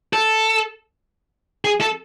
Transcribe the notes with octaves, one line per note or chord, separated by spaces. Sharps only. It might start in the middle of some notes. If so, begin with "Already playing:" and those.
A4
G#4
A4